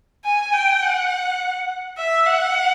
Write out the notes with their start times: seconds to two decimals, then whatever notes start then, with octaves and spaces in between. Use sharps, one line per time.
0.25 G#5
0.53 G5
0.82 F#5
1.97 E5
2.26 F#5